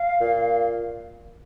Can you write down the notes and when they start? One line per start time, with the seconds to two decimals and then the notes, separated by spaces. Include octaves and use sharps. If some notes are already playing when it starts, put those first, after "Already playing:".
Already playing: F5
0.21 A#2